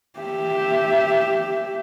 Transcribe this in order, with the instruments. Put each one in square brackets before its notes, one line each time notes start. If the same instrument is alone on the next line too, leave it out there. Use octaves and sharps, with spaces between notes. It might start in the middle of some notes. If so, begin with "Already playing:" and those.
[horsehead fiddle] G4 E5